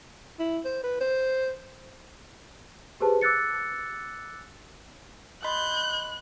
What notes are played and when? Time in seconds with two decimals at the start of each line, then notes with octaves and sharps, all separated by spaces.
0.39 E4
0.65 C5
0.83 B4
1.01 C5
3.00 G4 G#4 B4 C5 A5
3.21 D6 E6 F#6 A6 C#7
5.44 D#5 B5 C6 F#6 G6